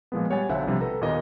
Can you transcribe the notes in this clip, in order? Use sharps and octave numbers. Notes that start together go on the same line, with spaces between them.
A#2 F3 G#3 B3
G3 C#5 F#5 G#5 A6
B1 D3 C5 E5 F#5
C3 F3 G3
A4 B4 A#5
D#2 A#2 A#3 B3 D#5